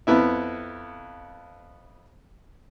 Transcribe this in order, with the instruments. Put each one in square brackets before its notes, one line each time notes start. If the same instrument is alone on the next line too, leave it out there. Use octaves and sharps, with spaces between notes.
[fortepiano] F2 B3 E4 E5